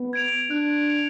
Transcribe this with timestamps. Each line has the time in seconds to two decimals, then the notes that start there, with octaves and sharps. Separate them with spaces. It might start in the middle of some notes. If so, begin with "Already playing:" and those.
Already playing: B3
0.13 G#6 D7 F7
0.50 D4 F#6
0.88 C#7 F7